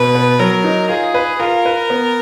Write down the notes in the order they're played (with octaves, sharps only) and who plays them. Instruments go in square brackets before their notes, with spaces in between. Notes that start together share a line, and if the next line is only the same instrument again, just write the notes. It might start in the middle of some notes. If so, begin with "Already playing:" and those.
Already playing: [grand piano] B2 [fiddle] B4
[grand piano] B3
[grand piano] F#3 [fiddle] A#4
[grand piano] D#4
[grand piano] F4 [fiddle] G#4
[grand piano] B4
[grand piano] F4 [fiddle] A#4
[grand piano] B4
B3